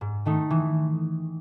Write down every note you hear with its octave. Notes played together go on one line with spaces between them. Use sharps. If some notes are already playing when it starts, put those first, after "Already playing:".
G#2
D#3 A3 D#4
E3